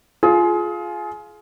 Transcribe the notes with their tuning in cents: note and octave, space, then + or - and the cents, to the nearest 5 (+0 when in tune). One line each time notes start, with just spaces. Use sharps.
F4 +0 G#4 +25